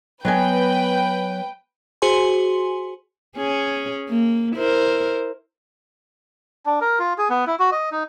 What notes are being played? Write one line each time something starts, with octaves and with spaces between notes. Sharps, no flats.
F#3 B3 B4 G5 G#5
F#4 G#4 C5 G#5 C6
C#4 G#4
A#3
E4 A#4 C5
D4
A#4
F4
G#4
B3
E4
F#4
D#5
D#4